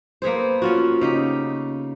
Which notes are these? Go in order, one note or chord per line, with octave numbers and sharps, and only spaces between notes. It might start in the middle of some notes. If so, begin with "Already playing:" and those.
A#3 B3 G#4 C5
C#4 F4 F#4
C#3 D#4 G4